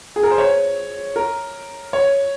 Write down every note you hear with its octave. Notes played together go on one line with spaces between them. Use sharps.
G#4
A#4
C5
C#5
A#4
C#5